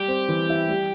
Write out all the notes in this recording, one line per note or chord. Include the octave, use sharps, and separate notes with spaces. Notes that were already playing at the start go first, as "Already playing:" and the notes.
Already playing: G3 G4
C4
E3
E4
G3